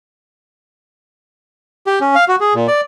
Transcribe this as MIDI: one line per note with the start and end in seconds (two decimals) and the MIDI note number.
1.87 1.99 67
2.01 2.15 61
2.15 2.25 77
2.28 2.36 66
2.40 2.54 68
2.54 2.67 46
2.68 2.81 74